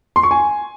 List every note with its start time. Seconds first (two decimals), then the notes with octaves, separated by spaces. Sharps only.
0.16 C6
0.23 C#6
0.31 G#5